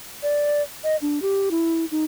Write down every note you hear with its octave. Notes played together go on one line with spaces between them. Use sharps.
D5
D#5
D4
G4
E4
D#4